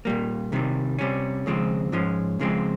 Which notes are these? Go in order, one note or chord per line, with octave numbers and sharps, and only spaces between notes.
A#2 G3 A#3
C2 C3 D#3 G3
C3 G3 C#4
D#2 C#3 F3 G#3 C4
G#2 F3 G#3 C#4
C#2 C#3 F3 G#3 C4